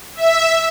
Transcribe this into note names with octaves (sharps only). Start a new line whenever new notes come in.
E5